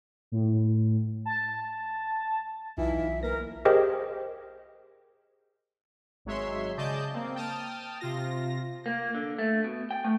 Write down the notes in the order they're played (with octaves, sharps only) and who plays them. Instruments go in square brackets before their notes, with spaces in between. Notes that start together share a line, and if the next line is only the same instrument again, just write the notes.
[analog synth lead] A2
A5
[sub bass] B1 [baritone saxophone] E3 [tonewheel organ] D#4 F4 [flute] E5
[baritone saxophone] A#3 [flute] A#4 [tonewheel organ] B4 A#6
[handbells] G4 G#4 A#4 C5 D#5 G5
[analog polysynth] G#1 F#3 G#3 C#5 E5 C6
C#3 D5 D#5 A5 G6
A#3 C4
G5 A5 D#6 F6
C3 F4 A#6
[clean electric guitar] A#3
D3
A3
B2
G5
A3